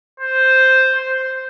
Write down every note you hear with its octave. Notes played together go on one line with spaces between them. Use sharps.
C5
C5